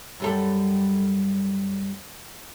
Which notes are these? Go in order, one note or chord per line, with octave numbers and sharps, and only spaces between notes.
F#2 G3 A4